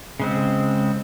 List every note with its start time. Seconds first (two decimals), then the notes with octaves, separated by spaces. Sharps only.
0.20 C#3 G#3 C4